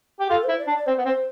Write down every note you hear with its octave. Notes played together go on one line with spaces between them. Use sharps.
G4
F4 A4
E4 C5
D5
D4
D5
C4 C5
B3 B4
C4 C5